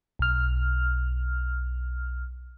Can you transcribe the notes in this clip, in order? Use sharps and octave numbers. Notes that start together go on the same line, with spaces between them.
B1 F6